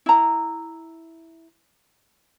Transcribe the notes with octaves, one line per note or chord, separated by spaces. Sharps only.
E4 A#5